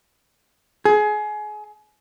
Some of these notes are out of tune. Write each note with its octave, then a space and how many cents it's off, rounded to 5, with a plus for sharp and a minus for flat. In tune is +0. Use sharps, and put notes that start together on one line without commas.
G#4 +25